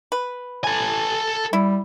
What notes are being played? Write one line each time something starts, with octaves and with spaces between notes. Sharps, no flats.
B4
A4 G#5
G3 E4